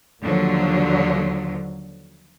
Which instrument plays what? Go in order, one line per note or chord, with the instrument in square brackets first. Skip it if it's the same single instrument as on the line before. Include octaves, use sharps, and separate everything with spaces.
[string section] D#2 D3 F3 F#3